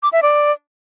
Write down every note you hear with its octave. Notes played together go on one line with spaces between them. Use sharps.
D6
E5
D5